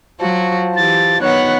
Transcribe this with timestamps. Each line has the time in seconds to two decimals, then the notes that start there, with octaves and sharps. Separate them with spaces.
0.20 F#3 F4 F#4 C5 A5
0.76 E3 G4 A6
1.21 D#3 B3 C#5 F#5 F#6